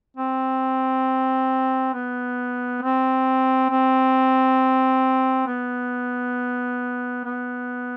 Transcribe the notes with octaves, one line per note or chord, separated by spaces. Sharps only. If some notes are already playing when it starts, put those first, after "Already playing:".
C4
B3
C4
C4
B3
B3